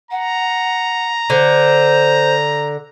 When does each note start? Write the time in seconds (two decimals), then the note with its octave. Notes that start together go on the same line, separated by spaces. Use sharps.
0.11 F#5 A#5
1.30 D3 C5